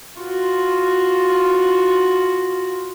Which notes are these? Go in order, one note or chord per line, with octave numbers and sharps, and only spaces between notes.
F4 F#4